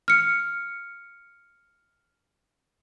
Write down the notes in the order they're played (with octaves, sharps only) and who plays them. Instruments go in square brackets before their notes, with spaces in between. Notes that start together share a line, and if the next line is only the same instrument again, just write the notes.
[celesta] F6 C#7